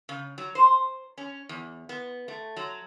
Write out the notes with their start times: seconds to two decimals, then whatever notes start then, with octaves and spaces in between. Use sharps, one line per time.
0.09 C#3
0.38 F#3
0.55 C5
1.18 C#4
1.49 E2
1.89 B3
2.28 A3
2.57 F#3